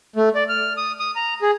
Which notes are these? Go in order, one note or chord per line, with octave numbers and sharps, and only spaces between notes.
A3
D5
F6
D#6
D#6
A#5
G#4